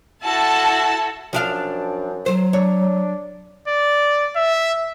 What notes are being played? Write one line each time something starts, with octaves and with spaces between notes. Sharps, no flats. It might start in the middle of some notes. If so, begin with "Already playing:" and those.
E4 F#4 A4 A5
F#2 F3 D4 F5
F#3 C5
D4 C#5
D5
E5